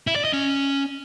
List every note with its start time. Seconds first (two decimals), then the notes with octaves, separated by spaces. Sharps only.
0.07 E4
0.16 D5
0.25 D#5
0.33 C#4